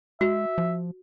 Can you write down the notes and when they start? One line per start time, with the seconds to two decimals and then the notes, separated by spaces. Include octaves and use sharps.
0.21 G#3 F#4 E5
0.58 F3